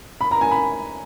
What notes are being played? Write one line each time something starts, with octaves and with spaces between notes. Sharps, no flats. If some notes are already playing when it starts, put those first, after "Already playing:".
B5
A#5
G#5
B5